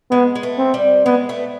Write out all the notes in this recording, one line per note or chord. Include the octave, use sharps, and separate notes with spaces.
G#3 B3
G#3
A3
C4
G3
G#3 B3
A3